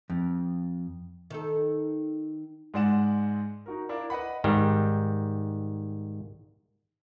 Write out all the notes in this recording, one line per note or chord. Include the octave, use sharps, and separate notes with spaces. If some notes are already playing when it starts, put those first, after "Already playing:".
F2
D#3 A4
G#2 G#3 D5 F#5 E7
D#4 F#4 A#4
D4 E4 A#4 F5
B4 D#5 F#5 B5
G#2 D#3 G3